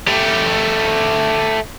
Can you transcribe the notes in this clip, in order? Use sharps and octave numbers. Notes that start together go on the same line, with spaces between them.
A3 G4